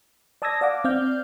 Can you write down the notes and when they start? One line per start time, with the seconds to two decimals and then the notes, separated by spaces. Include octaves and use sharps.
0.42 D5 A5 D#6 E6 G#6 A#6
0.61 D5 F5 F#5 D6
0.84 C4 D5 F5 F6 G6